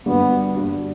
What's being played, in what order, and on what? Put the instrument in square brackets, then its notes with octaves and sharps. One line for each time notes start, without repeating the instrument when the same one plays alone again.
[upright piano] G2 D3 G3 D4 F#4 [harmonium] B3
[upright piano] G2 D3 G3 D4 F#4